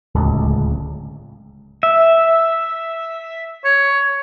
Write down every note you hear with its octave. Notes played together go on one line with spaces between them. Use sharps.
D1 C#2
E5
C#5